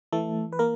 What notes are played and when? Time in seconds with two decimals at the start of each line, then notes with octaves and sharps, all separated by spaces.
0.12 E3 A3 A4
0.52 B4
0.59 A#3 A#4